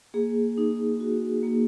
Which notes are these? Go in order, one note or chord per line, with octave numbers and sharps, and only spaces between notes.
A#3 G#4
D#4
F#4
A#3